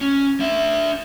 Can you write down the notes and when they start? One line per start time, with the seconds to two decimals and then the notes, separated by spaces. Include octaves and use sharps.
0.01 C#4
0.40 D4 E5